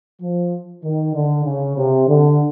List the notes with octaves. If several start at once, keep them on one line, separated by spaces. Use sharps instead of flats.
F3
D#3
D3
C#3
C3
D3